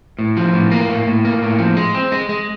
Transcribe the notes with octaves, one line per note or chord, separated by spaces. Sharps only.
A2
F3
A2
A#3
A2
A2
A#3
A2
F3
G#3
C4
G#3
G#3